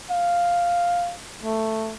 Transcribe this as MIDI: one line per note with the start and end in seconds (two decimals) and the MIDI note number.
0.11 1.14 77
1.43 1.95 57